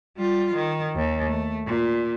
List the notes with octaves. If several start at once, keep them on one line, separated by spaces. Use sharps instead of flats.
G3 F4
D#3
D#2
A3
A#2